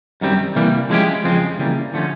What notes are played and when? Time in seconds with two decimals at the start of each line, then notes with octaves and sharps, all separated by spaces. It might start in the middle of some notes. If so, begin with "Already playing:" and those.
0.21 F#2 D#3 G3 C4
0.55 C3 E3 G3 A#3
0.90 F3 G#3 C#4 E4 G4
1.24 F2 C#3 F3 G#3 C4
1.58 C#3 E3 G3 A#3
1.94 D3 F3 A3 C#4